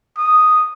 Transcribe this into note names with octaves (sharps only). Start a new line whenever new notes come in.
D#6